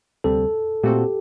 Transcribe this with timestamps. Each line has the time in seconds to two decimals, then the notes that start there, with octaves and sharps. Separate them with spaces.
0.24 D2 C3 G3 C4 A4
0.83 A#2 A3 C4 F#4 G4 A4